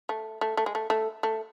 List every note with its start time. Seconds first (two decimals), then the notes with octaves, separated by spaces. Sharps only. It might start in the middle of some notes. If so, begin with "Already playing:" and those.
0.09 A3
0.41 A3
0.57 A3
0.66 G#3
0.75 A3
0.90 A3
1.23 A3